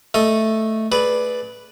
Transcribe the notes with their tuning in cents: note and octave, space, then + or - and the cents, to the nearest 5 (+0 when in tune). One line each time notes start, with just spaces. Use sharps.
A3 +0 A4 +0 D#5 +10
G#4 +35 B4 +0 D5 +0